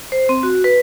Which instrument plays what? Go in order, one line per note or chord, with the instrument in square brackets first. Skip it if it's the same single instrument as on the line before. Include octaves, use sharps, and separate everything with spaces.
[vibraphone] C5
C4
F#4
B4